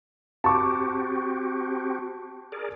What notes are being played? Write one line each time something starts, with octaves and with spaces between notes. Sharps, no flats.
C4 F#4 G4 A5 C#6 D6
G#4 A#4 D5